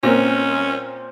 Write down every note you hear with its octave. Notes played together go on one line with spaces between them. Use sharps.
A#2 C4 C#4 A#4